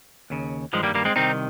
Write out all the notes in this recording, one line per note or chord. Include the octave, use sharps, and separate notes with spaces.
D#2 C#3
G2 D#3 F3 G#3
G3 A#3
G3 A#3
G#3 C4
C2 C3 D#3 C4 D#4